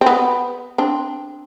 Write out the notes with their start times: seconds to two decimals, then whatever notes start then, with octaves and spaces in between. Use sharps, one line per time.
0.01 C4
0.06 B3
0.78 C4 D4